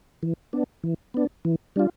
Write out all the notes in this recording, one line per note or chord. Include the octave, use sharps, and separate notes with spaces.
E3
B3 D4
E3
B3 D4
E3
G3 D4 F4